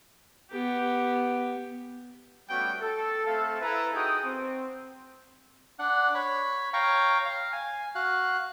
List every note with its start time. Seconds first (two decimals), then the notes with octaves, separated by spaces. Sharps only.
0.51 B3 G4
2.49 G3 A3 B3 C#4 F#4 G5
2.80 A4
3.26 A3 C4 A4 E5 F5 A5
3.62 E4 A4 B4 G#5 A#5
3.94 D#4 F#4 G#4 G5 D#6
4.24 C4
5.79 D4 F#5
6.15 C#5 B5
6.73 C#5 F5 G5 A#5 C#6
7.25 F5
7.53 G#5
7.95 F#4 F5 F#6